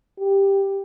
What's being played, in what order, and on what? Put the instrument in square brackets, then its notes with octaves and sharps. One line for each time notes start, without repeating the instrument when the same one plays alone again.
[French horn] G4